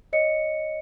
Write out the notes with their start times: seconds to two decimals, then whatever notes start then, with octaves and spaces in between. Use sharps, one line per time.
0.13 C#5 D#5 C#7